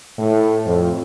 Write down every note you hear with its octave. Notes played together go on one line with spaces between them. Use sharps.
A2
F2